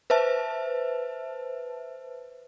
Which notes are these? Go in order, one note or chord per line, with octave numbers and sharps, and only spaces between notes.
B4 C5 E5 A5